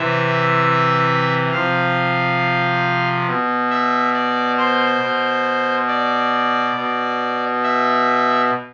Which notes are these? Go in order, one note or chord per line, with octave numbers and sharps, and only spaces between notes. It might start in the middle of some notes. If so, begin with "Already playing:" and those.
Already playing: C3 E3 E5
C3 F3 F5
B2
E5
D5
C5
B2
D5
B2
E5